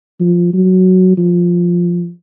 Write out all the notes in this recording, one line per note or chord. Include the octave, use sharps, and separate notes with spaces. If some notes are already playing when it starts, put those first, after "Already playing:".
F3
F#3
F3